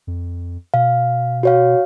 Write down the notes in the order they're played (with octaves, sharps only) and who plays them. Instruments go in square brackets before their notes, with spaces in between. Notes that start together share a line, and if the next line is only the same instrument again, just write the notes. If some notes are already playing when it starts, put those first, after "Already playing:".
[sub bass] F2
[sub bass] B2 [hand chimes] F5
[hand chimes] F#4 C#5 F5